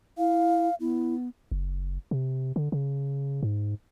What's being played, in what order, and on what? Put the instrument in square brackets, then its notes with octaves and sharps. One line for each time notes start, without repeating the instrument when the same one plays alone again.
[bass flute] E4 [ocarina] F5
[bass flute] B3 [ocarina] E4
[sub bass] F#1
C3
D3
C#3
G#2